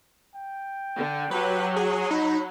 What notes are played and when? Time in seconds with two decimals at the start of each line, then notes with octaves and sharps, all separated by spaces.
0.35 G5
0.96 D3
1.31 F#3 G4 B4
1.76 G#4
2.11 D#4 B5